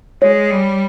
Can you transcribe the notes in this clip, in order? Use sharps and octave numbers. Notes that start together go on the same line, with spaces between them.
G#3 C#5
G3